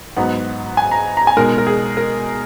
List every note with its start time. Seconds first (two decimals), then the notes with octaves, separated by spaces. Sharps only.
0.16 G#2 F#3 B3 D#4 F#5
0.77 G#5
0.91 A#5
1.17 A#5
1.27 G#5
1.37 B2 G#3 D#4 A#4
1.58 A#4
1.67 G#4
1.97 A#4